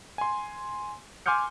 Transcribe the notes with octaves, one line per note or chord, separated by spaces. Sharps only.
G#5 C6
G#5 C6 D6 F6 G6 C#7